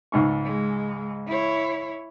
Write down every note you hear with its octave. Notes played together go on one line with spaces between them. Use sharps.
C#2 G#2 C#6
G#3
E4 C#5